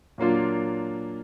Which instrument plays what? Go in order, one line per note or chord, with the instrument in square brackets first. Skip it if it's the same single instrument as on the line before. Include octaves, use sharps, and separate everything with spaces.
[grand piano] A#2 F#3 A#3 D4 F4